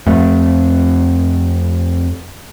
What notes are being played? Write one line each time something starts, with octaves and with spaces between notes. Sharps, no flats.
F2 A3